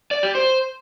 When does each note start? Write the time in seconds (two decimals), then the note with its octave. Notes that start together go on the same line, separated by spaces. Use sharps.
0.11 D5
0.23 G4
0.35 C5